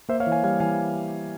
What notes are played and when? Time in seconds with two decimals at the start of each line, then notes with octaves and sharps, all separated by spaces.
0.09 A#3 C5 E5
0.20 C#5 F5
0.27 E3
0.32 F5 G#5
0.43 G3 F5 G#5
0.60 E3 F5 G#5